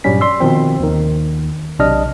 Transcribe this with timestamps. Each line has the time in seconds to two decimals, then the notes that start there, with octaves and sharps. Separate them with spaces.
0.04 G2 A#2 F#3 G3 C#4 B6
0.21 D5 C6 E6
0.40 B2 D#3 F3 C4
0.80 D#2 D#3
1.79 B1 C3 D4 D5 D#5 F6